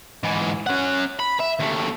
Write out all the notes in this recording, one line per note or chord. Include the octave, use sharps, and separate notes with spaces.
G#2 E3
C#4 F#5
B5
E5
D#2 A3